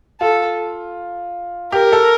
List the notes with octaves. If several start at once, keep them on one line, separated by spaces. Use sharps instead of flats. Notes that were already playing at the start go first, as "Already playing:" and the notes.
F4 A4
G4 A#4
A4